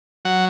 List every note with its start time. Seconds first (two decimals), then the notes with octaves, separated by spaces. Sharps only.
0.25 F#3 F#5